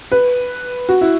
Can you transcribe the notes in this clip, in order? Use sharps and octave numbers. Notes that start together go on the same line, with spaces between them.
B4
F#4
E4